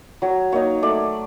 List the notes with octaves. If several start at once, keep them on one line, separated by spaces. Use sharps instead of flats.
F#3 C#5
A#3 D#4 C#5
A3 D5